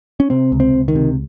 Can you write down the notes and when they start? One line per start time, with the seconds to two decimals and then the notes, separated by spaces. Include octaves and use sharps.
0.20 C#4
0.30 C3 C4
0.52 C#2
0.60 C4
0.74 C#2
0.88 D#3
0.95 C3